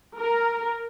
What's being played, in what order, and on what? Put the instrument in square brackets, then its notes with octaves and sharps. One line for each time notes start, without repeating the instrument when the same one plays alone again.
[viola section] A#4